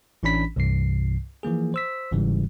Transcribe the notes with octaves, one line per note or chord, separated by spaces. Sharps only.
A1 E3 C#4 D4 B5 B6
C2 G2 C3 E3 C7
E3 F3 A#3 G#4
C5 E6 B6
G1 G#2 C#3 E3 G3